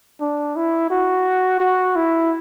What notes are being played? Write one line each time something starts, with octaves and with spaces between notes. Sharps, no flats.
D4
E4
F#4
F#4
E4